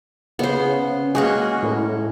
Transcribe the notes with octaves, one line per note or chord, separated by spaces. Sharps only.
C#3 B3 C5
G#3 A#3 C#4 F#4
A2